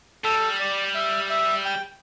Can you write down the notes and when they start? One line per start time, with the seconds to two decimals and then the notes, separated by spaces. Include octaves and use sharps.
0.24 G3 A4
0.60 D5
0.95 E5
1.30 E5
1.65 G5